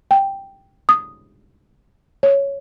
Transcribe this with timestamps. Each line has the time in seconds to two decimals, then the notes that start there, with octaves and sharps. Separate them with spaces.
0.11 G5
0.89 D#6
2.23 C#5